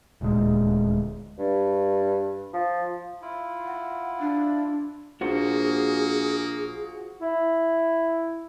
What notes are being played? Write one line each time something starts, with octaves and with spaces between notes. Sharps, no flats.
D#1 D2 A#2 G#3
G2
F3
E4 F4
F#5
D4
A#1 A#3 F4 F#4 G#4 C5
E4